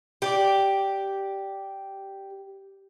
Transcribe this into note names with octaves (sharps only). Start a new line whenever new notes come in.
G4 D5